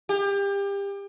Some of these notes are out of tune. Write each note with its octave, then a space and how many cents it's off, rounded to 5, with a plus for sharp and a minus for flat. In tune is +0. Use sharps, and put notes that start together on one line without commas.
G4 +30